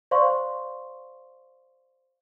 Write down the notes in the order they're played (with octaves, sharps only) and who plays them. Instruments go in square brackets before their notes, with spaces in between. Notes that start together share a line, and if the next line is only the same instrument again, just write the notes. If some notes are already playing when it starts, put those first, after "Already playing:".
[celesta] C5 D5 F5 C6 C#6